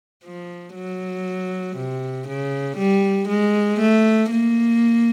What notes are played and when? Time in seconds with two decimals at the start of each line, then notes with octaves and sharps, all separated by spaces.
0.25 F3
0.75 F#3
1.77 C3
2.28 C#3
2.77 G3
3.28 G#3
3.80 A3
4.31 A#3